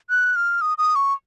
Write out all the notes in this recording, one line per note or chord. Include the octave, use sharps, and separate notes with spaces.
F#6
F6
D#6
D#6
C#6